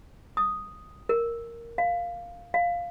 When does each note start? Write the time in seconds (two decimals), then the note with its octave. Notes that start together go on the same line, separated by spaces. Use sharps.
0.37 D#6
1.09 A#4
1.78 F5
2.54 F5